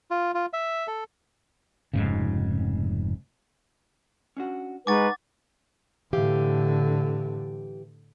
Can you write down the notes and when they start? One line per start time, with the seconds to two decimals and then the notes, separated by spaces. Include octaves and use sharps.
0.11 F4
0.34 F4
0.53 E5
0.87 A4
1.93 F1 G#2 C#3
4.37 C#4 D4 F#4
4.87 G#3 D#4 B4 F#5 G#5 C#6 D6 A6
6.13 A2 D3 E3 G4 F5